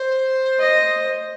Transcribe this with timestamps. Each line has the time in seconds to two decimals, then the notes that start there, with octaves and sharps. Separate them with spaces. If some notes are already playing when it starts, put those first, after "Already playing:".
Already playing: C5
0.59 D#5